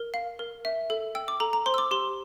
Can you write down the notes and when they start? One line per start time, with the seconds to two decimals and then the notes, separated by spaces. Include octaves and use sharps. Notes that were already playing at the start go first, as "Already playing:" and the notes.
Already playing: A#4
0.14 F5
0.39 A#4
0.65 E5
0.90 A4
1.15 G5 E6
1.28 D6
1.40 A4 A#5
1.53 A#5
1.66 C5 C6
1.74 E6
1.78 D6
1.91 G4 C6